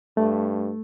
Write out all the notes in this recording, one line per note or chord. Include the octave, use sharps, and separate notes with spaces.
G2 A3